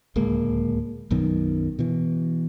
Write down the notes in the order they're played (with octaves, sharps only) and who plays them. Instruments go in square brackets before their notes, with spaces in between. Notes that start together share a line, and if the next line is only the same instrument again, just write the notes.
[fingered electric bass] D1 C#2 G#3 A#3
B1 F#2 B2 D#3
B2 E3